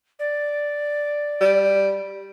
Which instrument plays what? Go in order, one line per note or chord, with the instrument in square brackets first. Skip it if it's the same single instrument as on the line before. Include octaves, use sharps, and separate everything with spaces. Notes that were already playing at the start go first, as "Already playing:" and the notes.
[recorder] D5
[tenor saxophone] G3